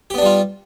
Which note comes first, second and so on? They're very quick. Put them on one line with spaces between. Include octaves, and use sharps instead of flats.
G4 B3 D4 G3 F4